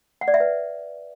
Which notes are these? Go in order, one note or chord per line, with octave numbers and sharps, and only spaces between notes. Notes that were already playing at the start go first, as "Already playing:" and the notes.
F#5
D5
E5
B4